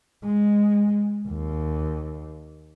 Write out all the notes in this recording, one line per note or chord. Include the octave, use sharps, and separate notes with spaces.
G#3
D#2